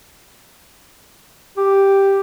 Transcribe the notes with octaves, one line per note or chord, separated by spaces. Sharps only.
G4